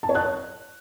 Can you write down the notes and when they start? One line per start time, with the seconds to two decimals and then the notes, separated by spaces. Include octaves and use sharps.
0.03 A5
0.09 C#5
0.15 F#6